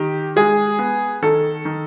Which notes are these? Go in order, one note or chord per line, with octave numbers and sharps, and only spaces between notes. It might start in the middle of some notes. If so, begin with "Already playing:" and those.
Already playing: D#3 G4
G#3 G#4
B3
D#3 A4
D#3